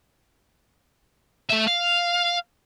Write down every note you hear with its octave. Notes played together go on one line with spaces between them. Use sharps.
A3 E5
F5